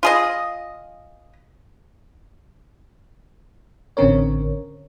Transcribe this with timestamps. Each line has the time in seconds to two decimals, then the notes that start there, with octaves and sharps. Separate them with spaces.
0.03 F4 G#4 D#5
3.97 A1 D3 C4 C#4 A#4 C#5